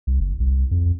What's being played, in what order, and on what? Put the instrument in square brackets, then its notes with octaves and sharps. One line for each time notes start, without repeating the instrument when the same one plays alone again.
[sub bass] C2
F#1
C2
F2